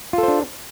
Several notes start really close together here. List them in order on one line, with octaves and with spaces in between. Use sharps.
F4 A4 C5 D4